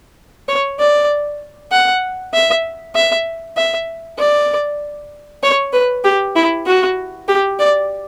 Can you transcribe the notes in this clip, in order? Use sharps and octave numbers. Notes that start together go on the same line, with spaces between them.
C#5
D5
F#5
E5
E5
E5
D5
C#5
B4
G4
E4
F#4
G4
D5